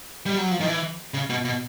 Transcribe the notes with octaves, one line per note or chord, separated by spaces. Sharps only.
G3
F#3
F3
D#3
E3
C#3
B2
B2